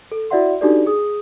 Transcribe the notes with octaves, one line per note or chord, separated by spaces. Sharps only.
A4
E4 F#4 D5 E5 F#5 C6
D4 D#4 F#4 G4 A4 D5
G#4 D#6